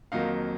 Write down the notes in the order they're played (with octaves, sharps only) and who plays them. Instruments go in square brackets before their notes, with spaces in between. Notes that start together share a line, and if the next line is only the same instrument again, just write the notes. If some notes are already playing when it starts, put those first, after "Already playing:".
[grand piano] F2 D#3 F#3 A#3 D#4 F5